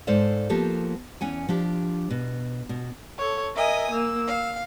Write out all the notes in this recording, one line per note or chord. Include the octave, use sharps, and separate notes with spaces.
G#2 A4 C5 D5 F5
F3 A#3 B3 G4 A4
E2 C#4 F#5 G#5
F3 D4 G4
B2
B2
A4 C#5
A#4 D#5 E5 G#5 D#6
A#3 E6
F5